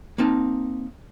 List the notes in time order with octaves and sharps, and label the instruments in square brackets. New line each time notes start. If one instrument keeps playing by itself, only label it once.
[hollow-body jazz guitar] A#3 C4 D#4 A5